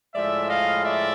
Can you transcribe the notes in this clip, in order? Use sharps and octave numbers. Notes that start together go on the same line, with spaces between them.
A2 F3 G#3 D5 E5
D#5 F5
D5 E5